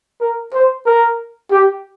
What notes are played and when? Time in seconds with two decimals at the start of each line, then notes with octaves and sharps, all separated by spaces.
0.21 A#4
0.53 C5
0.86 A#4
1.51 G4